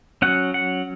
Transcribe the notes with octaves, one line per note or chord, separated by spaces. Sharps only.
F#3 C#4 F#5
F#5